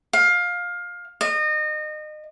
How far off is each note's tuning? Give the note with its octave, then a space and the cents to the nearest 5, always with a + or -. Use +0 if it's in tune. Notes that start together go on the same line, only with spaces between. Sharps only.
F5 +20
D#5 -30